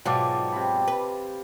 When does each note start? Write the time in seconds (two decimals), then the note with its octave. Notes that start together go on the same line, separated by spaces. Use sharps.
0.06 G#2 B2 F#3 F4 D5 G5 A5 D6
0.52 C3 B5
0.88 B4